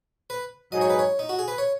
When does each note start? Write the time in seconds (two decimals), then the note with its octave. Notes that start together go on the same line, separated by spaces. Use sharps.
0.30 B4
0.72 G#2 F#3 D#4 G#4 D#5
0.81 C#5
0.90 B4
0.99 C#5
1.19 D#4
1.29 F#4
1.39 G#4
1.48 B4
1.58 C#5